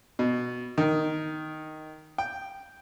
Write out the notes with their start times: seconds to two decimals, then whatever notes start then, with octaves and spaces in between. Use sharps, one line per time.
0.19 B2
0.78 D#3
2.18 G5